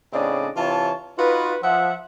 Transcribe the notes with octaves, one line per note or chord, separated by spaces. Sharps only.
A2 C#3 C4 D4 D5 D#5
C3 E3 F4 C#5 A5
D#4 F4 F#4 B4
F3 E5 F#5